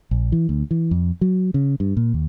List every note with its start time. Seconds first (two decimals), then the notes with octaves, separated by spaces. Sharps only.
0.11 A#1
0.32 E3
0.49 D2
0.71 E3
0.91 F2
1.21 F#3
1.54 C#3
1.80 G2
1.97 A#2
2.14 D#2